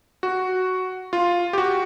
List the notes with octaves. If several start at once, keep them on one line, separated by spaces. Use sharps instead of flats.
F#4
F4
G4
F#4